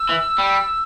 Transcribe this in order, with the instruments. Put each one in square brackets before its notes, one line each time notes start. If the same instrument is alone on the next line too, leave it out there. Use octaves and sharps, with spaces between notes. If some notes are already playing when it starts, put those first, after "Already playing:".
Already playing: [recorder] E6
[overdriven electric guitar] E3
G3